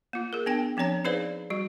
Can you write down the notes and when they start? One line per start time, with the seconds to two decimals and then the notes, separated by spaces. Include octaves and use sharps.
0.13 A#3 F4
0.33 G#4 A#4
0.46 B3 D4 G5 G#5
0.77 F3 C4 D4 C#5 A#5
1.05 D#4 G#4 B4 C5 D5 F5
1.50 G3 F#4